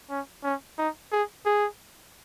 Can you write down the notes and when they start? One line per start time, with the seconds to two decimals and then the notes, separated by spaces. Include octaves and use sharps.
0.10 C#4
0.44 C#4
0.78 D#4
1.12 G#4
1.46 G#4